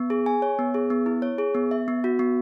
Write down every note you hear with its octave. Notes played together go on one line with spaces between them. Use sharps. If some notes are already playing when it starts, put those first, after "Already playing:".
Already playing: B3
G#4
G#5
C#5
B3
G#4
B3
E4
C#5
G#4
B3
E5
B3
F#4
B3